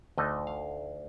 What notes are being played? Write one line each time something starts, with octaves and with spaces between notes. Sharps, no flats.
D2 D3 A3 D#4 D#5
F5